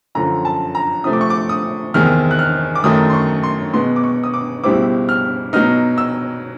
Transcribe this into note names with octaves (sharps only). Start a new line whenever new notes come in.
F#2 D3 F3 A#5
A5
A#5
C3 F3 A3 D#6
D6
C#6
D6
D#6
E2 C3 D#3 G#3 F6
F#6
F6
D6
F#2 D#3 F#3 A3 D#6
C6
C#6
C6
B2 G#3 B3 C6
D6
C#6
D#6
D6
C#2 B2 G3 C4 E4 D6
F6
B2 F#3 B3 D#4 F6
E6